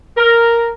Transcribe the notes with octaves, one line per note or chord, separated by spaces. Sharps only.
A#4